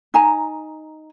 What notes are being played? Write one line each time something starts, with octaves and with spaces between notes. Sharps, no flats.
D#4 G#5 A#5